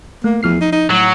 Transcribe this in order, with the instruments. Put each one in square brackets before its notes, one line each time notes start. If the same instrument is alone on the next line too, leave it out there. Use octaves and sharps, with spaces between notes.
[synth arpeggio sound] A3 [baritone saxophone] A#3
[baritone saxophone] E2 [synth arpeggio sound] F3 F6 C7
[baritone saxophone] D#4
D#4
[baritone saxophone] A2 [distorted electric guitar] F#3